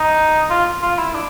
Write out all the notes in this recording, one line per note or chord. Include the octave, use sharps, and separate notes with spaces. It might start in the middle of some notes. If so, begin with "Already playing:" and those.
Already playing: D#4
F4
F4
E4
D4